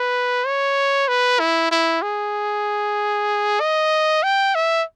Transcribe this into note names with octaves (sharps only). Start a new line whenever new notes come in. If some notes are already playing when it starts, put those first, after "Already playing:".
Already playing: B4
C#5
B4
E4
E4
G#4
D#5
G5
E5